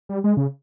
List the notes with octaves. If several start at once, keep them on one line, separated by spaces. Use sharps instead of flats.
G3
G#3
C#3